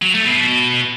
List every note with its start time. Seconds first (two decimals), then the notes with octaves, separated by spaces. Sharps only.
0.02 F#3
0.14 A3
0.26 B2